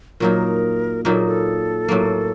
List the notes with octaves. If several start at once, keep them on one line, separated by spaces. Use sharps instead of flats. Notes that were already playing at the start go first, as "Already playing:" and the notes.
A#2 F#3 A#3 D#4 A#4
A#2 F#3 A#3 D#4 A#4
A4
G#4
A4
A2 F#3 A#3